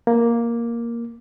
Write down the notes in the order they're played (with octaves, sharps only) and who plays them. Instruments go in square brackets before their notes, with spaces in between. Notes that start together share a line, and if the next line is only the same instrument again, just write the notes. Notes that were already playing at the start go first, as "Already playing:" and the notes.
[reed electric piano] A#3